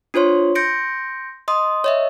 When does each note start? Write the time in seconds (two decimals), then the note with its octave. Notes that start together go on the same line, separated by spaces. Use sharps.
0.14 D4 F4 C5 C#5 C6
0.55 C6 G6 A#6 C#7 D7
1.48 D#5 C6 D#6
1.84 C#5 D#5 E5